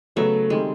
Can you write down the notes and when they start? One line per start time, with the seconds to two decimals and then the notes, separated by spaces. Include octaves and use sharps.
0.16 C#3 F#3 A3 B3
0.50 D#3 G3 G#3 C4